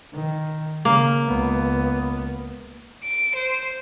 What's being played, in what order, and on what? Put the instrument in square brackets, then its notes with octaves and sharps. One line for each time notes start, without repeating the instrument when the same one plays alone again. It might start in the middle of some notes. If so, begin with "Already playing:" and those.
[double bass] D#3
[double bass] C#3 [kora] A#3
[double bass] C#2 B3
[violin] D7
C5